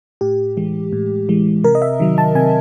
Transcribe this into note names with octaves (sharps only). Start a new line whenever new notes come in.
A2 G4
E3 G#3
A2
E3 G#3
C3 A#4
D#5
E5
D#3 F#3
A5
C3 G#5